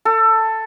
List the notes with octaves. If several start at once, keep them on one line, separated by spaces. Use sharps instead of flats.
A4